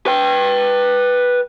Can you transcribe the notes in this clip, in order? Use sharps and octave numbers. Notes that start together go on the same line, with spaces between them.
B4 G5